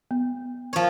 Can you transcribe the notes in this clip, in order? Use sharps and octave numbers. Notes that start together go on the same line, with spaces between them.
B3
F3 C#5